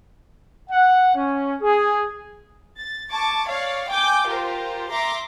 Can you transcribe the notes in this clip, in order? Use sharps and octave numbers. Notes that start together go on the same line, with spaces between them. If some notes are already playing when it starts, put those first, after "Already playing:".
F#5
C#4
G#4
A6
A5 C#6 D6 G#6
C#5 D5 F5
G5 G#5 D6 G6
F4 G4 A#4 C5
E5 A#5 C6 D6